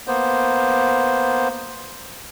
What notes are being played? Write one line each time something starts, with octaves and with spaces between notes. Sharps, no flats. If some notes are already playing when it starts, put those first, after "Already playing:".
A#3 B3 C5